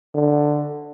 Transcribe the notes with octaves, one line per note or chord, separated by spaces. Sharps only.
D3